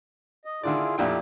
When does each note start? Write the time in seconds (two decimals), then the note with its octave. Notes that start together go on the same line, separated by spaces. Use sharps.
0.45 D#5
0.63 D3 D#3 E4 F4 G#4 D5
0.98 F2 A#2 E4 G4 A4 G5